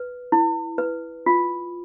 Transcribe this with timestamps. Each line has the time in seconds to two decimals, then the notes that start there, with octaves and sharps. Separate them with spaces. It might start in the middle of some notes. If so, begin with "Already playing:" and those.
Already playing: B4
0.32 E4
0.78 B4
1.26 F4